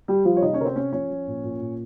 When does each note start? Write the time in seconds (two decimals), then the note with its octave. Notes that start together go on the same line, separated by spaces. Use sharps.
0.08 G3 G4
0.25 F3 G3 F4
0.37 C#5
0.42 C3 D#4 D#5
0.53 C#4 C#5
0.60 C3 A#4
0.65 C4 C5
0.76 C3 C#4 C#5
0.93 F3 C#4 C#5
1.10 F3
1.27 A#2
1.44 A#2
1.60 A#2